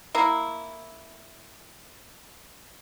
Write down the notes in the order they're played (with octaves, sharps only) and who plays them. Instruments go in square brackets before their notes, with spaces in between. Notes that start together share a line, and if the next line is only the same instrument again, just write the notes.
[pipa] A#3 E4